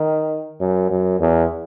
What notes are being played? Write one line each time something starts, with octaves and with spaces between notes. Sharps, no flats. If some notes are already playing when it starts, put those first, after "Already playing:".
Already playing: D#3
F#2
F#2
E2